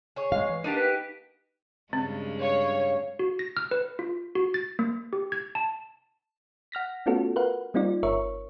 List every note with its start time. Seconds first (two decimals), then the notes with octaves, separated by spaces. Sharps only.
0.16 G#4 C#5
0.32 G#3 F5
0.49 E3
0.64 A#3 B3 D4 D#4 G4 A5
0.76 B4
1.93 G2 C#3 G#3 C4
2.41 C#5 F5
3.19 F#4
3.39 A#6
3.57 F6
3.71 B4
3.99 F4
4.35 F#4
4.54 A6
4.79 A#3
5.13 G4
5.32 G#6
5.55 A5
6.72 F#5 F6 A#6 B6
7.06 A3 B3 C#4 F4 F#4 A4
7.36 A#4 B4 F5 F#5
7.74 G3 A#3 C4 D#4 F4 D5
8.03 G1 A#4 C#5 E5 C#6